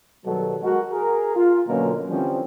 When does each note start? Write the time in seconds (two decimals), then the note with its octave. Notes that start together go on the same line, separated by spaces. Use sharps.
0.26 B2 D#3 F#3 G3 A4
0.62 G#3 F#4 A#4
0.92 G#4 A#4
1.35 F4
1.68 B2 D3 F#3 A#3 C#4 A#4
2.10 D3 E3 F3 G3 C4 C#4